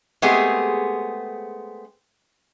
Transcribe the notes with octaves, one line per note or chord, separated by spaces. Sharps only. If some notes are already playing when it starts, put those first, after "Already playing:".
G#3 A3 B3 C4 G4 G#4